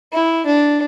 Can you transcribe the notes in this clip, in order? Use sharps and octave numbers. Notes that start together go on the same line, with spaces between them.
E4
D4